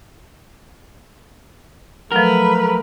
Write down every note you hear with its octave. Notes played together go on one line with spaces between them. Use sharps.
F3 F#3 A3 A#4 B4